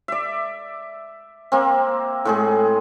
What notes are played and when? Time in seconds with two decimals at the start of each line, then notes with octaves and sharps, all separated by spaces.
0.08 D5 E5
1.52 A#3 C4
2.25 A2 G#3 G#4